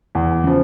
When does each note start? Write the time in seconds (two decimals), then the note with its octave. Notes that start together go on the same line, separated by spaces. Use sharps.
0.15 E2
0.44 C#3 F3